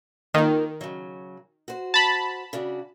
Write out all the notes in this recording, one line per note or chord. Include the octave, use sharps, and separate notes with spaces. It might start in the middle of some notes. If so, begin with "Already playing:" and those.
D#3 A#3 F4
C#3 F#3
F#4 C5
A5 B5
C#3 D4 F#4